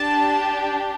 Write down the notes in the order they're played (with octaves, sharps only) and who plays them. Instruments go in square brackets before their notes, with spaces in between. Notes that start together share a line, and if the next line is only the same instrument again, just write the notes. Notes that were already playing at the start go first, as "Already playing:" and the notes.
Already playing: [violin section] D4 G4 A5